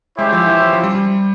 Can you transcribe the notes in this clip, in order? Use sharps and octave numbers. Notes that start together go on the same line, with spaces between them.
G#3 C#4 E4 G4 C5 E5
F3
E3
F3
F3
G3
G3